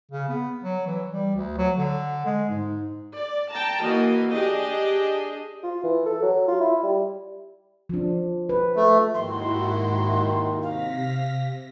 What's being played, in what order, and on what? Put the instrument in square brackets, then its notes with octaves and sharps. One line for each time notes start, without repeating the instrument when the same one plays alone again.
[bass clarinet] C#3
B3
F#3
E3
G3
D2
F#3
D3
G#3
G#2
[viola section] D5
G5 A5 A#5
E3 A#3 F#4 D#5
D4 G4 G#4 D#5
[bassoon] F4
E3
A4
F#3
F4
E4
G3
[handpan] F3 D4
B4
[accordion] A3
[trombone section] D#2 D#3 [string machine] G#2 E4 F#4 [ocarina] C6
[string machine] C3 A#6 B6 [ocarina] F5